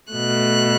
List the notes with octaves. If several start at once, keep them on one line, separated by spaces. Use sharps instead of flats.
B2 A3 F#6